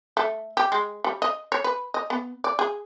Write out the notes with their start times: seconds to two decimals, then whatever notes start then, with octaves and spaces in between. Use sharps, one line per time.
0.17 A3
0.57 G4
0.72 G#3
1.04 G3
1.22 D#5
1.52 C#5
1.64 B4
1.94 D#5
2.10 B3
2.44 D5
2.59 G#4